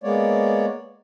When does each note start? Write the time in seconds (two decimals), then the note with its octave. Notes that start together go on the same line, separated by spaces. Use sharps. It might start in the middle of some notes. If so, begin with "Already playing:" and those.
0.04 G#3 A#3 B3 C#5 D5